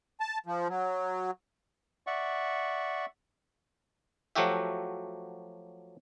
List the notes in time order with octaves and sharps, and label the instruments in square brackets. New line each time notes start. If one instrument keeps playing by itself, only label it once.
[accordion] A5
F3
F#3
[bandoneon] D5 E5 F#5 C#6
[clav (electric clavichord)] F3 F#3 A3 F#4 G4 E5